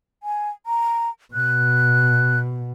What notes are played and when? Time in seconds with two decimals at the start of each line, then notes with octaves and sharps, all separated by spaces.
0.23 G#5
0.66 A#5
1.33 B2 F#6